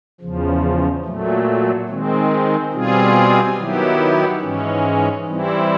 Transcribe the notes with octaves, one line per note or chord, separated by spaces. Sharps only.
E2 C#3 F3
A#2 F#3 A3
D#3 G#3 C4
B2 G3 C4 F4 G#4
D#3 F#3 B3 E4 G4
G#2 E3 G#3 C#4
E3 G3 C4 E4